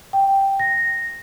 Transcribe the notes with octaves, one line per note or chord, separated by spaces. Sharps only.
G5
A#6